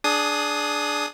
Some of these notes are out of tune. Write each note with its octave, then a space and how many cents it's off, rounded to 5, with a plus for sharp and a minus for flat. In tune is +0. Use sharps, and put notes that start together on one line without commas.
D4 +0 G#4 +20 D#6 +0